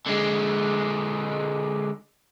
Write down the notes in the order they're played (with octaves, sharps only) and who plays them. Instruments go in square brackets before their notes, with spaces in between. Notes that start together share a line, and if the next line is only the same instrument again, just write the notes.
[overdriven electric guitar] D3 G#3